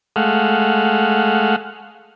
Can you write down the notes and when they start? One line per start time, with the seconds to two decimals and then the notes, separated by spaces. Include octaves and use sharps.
0.16 G#3 A3 F5 F#5